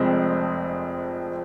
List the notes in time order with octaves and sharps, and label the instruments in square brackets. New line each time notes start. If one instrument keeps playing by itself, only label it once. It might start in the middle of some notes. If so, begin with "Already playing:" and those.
Already playing: [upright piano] F1 F2 F3 G#3 C4